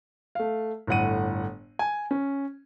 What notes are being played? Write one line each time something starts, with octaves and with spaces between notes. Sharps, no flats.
A3 F5
G1 A2 F#5 D#7
G#5
C#4